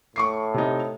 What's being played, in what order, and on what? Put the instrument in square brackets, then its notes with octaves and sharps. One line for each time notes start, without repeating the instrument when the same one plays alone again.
[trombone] A2 [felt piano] C#6 D6 C7
[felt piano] C3 D#4